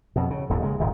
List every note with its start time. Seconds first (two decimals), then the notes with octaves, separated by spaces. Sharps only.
0.16 F2 B2
0.30 C#3
0.49 D#1 D#2 G#2
0.63 C#3 G#3
0.80 D#1 G#1 D#3